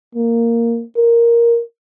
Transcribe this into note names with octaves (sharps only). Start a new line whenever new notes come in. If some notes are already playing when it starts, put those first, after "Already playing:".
A#3
A#4